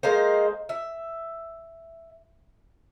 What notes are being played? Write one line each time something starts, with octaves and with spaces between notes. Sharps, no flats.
G#3 A#3 D#4 C5
E5